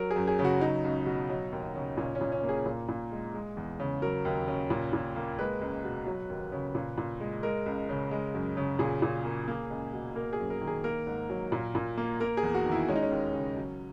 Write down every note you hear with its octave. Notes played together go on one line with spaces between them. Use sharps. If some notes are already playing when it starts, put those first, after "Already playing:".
Already playing: F#3 A#4
G#4
F#2
G#4
C#3
F#4
F#3 D#4
C#2
B2
F#3
D#2
C#3
A#2 C#4
C#4
A#2
C#4
A#3
G#4
A#2
A#2
G#3
G#3
E2
C#3
F#3 A#4
D#2
C#3
A#2
A#2
A#3
G#3 B4
C#2
B2
F#3
D#2
C#3
A#2
A#2
G#3
G#3 A#4
C#2
C#3
G#3
F#2
C#3
A#2 G#4
A#2
A#3
A#3
C#2
B2
A#3 A#4
G#4
F#2
A#4
D#3
G#4
A#3 A#4
G#2
F#3
A#2
A#2
A#3
A#3 A#4
G#4
E2
F#4
D#3
E4
G#3 C#4
D#4
C#4
D#2
C#3
F#3